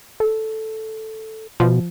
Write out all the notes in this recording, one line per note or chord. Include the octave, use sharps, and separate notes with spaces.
A4
B2 F3